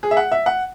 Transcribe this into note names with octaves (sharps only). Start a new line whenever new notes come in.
G#4
E5
F#5
E5
F#5